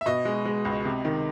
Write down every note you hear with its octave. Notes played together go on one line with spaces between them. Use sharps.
E5
B2 D#5
G#3
G#3
C#2
C3
D#3